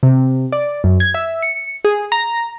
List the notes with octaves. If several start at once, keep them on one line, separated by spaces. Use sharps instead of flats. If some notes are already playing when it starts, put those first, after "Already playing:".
C3
D5
F#2
G#6
E5
C#7
G#4
A#5